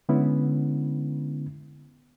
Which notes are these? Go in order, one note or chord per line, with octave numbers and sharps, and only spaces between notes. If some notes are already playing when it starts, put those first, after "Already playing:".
D3 G#3 B3 C#4 E4